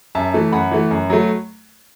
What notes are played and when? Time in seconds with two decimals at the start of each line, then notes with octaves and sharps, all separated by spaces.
0.15 F#2 E5 A5
0.34 E3 A3
0.52 F#2 F#5 B5
0.71 E3 A3
0.91 F#2
1.10 F#3 A3